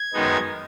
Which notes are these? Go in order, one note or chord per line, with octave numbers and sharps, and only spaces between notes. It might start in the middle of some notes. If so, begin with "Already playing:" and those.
Already playing: G#6
F#2 D#3 G#3 B3 D#4